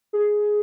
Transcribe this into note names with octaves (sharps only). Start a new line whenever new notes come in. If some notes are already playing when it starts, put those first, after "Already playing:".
G#4